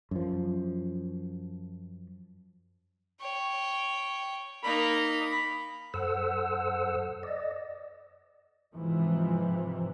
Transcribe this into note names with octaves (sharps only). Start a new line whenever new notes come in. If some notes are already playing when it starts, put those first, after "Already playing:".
F#2 F3
C#5 G5
A#3 D#4 B5
F#2 A4 C5 F#5 E6
D5 D#5
G#2 C3 E3 F3